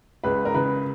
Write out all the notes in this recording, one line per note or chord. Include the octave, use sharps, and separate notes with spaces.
C#2 B4
A#4
C#3 B4